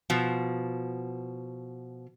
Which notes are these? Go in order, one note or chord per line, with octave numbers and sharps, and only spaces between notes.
B2 F3